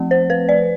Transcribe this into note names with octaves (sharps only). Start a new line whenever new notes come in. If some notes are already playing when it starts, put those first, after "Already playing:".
Already playing: F3 A3 C4
C5
B4
D5